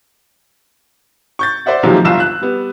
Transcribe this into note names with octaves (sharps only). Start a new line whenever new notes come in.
C#6 G6 A6
C5 D5 E5 F#5
C3 D#3 F3 F#3 G#3 A#3
G1 C2 F4 A#5 E6 E7
F#6
G3 B3